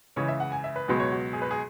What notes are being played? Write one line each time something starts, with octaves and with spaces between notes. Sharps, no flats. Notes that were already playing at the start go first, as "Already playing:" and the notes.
C#2 C#3 E3 C#5
E5
F#5
G#5
E5
B4
C#2 B2 F#3 B3 G#4
C#5
F#4
G#4
B4
G#4